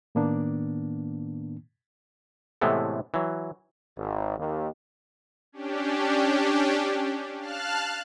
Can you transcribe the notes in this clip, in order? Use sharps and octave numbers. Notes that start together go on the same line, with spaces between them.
A2 D#3 A#3 B3 D4
A2 C3 E3 G#3 A3 B3
E3 F#3
G#1
D#2
C#4 D4 G4
F5 A5 F6 F#6